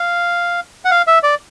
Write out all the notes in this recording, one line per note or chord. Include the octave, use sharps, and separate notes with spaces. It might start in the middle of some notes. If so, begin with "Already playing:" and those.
Already playing: F5
F#5
F5
E5
D5